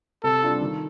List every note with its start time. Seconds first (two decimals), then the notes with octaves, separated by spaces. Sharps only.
0.24 C3 A4
0.43 G3 D4 F4
0.61 D#3